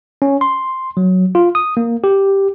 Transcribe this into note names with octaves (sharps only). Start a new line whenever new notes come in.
C#4
C6
F#3
F4
D#6
A#3
G4